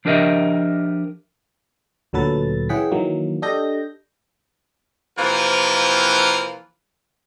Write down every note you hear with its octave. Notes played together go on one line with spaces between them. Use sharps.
F3 D4 G4 A#4 D#5 E5
D2 A#2 F#3 A4 B4 A6
E3 C#4 G#4 F#5 G5 B6
D#3 E3 F#3 A#3
D4 G4 A4 D#5 G6 A#6
C3 E3 F3 A#3 F4 A#4